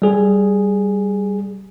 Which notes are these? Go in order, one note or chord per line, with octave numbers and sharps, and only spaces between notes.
G3 G#4